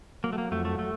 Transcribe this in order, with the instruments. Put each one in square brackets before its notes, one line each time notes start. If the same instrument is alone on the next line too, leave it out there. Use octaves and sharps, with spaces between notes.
[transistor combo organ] F#3 [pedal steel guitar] A#3
[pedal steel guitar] A3
A#3
[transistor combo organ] F2 [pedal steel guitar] A3
[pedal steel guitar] A3
A3